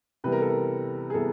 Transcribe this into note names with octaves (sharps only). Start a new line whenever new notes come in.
C3 E3 G3 B3 B4
A#4
A4
A#4
G#4
C3 E3 G3 B3 A4